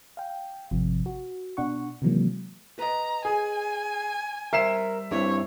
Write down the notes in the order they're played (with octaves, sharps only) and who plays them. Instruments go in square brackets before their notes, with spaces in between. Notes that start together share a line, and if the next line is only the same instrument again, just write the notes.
[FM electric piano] F5 G5
G#1 C3 F3
F#4
B2 D4 F#5 C#6
C3 D#3 E3 F#3 G#3 A#3
[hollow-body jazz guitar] B4 D#5 [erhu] A#5
[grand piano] G#4 [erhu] G#5
[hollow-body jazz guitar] G3 C5 [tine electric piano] A#4 [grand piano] E5 C7 E7
[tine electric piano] G2 [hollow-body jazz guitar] C4 E4 D5 [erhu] C#5